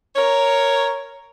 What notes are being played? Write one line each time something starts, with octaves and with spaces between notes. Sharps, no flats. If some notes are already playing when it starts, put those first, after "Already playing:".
A#4 C#5